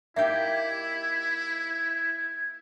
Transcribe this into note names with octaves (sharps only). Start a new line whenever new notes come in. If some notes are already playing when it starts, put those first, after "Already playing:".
A#3 D#4 E4 G4 E5 G#6